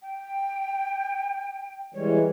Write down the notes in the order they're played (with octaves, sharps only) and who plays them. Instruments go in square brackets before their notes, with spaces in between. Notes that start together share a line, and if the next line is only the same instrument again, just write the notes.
[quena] G5
[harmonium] E3 G3 G#3 [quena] C#5